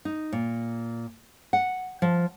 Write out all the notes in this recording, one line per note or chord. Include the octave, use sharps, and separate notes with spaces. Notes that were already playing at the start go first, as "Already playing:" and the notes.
D#4
A#2
F#5
F3